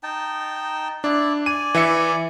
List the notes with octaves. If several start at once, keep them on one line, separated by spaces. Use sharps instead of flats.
D#4 G5 A5
D4 E4 D5
D5 G#5 D#7
E3 E5 C#7